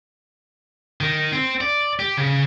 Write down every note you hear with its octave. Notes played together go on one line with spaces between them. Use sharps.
D#3
C4
D5
G4
C#3